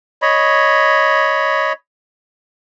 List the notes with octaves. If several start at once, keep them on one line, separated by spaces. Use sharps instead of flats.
C#5 D#5 B5